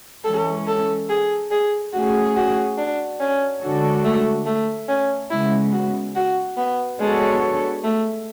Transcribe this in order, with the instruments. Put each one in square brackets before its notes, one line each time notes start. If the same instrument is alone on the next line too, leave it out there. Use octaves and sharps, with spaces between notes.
[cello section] E3 G#3 C#4 [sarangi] A4
[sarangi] A4
G#4
G#4
[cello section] A3 C#4 G#4 [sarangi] F#4
[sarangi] F#4
D4
C#4
[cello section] D3 G#3 D4 F#4 A4
[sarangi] A3
A3
C#4
[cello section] C#3 G#3 B3 [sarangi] E4
[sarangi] F#4
F#4
B3
[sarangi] G#3 [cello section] B3 D4 F#4 A4 C#5
[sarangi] A3